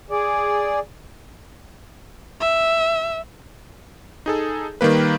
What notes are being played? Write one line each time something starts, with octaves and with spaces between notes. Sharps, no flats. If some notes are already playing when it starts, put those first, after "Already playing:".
G#4 D5
E5
D#4 G#4 A4
D#3 G3 A#3 B4